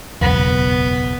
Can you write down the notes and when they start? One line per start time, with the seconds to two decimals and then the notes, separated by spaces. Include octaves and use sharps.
0.21 F#1 B1 E2 B3